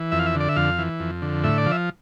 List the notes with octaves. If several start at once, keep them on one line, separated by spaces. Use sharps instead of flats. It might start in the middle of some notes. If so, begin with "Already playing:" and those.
Already playing: E3
F2 E5
F5
E5
D3
D5
E5
F2 F5
E3
F2
D3
A2 E5
D5
F3
E5